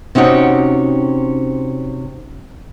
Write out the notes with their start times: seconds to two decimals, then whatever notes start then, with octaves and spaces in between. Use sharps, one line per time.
0.15 C3 C#4 D#4 F#4 G4